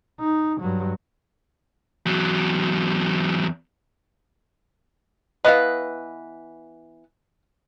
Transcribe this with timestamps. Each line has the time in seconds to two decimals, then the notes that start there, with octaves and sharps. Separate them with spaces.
0.20 D#4
0.60 G2 F#3
2.06 E2 F#3
5.45 E3 B3 B4 D#5 F5